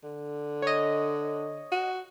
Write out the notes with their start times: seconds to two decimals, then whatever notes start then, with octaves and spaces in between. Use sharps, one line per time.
0.03 D3
0.62 C#5 D#5
1.72 F#4